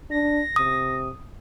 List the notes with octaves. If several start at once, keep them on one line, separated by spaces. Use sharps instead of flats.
D4 A#6
C3 D#6